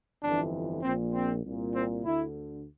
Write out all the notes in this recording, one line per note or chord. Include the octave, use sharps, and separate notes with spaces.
G1 F2 E3 D4
A#1 A#2 C4
C4
C2 A#2
C4
D2 D3 E4